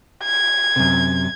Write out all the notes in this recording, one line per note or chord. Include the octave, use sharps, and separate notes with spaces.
G#6
F#2 C3